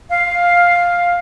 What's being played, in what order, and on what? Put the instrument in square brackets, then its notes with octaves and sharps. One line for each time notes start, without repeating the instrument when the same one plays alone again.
[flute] F5